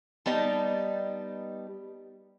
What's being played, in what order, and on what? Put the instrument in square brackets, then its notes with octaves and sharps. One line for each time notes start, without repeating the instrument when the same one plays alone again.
[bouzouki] G3 B3 D#4 A5